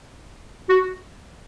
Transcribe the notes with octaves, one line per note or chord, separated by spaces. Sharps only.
F#4